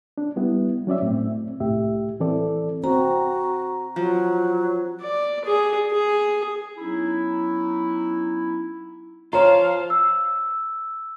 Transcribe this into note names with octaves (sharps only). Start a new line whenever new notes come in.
D4
G3 B3 E4
F#3 C#4 D5 E5
A2 C4
C2 A2 G4 E5
E3 C4 A4 D5
C4 F#4 A#5
F3 F#3
D5
G#4
G#4
F#3 B3 C#4 D#4 E4
F4 C5 C#5 F5 A#5
E6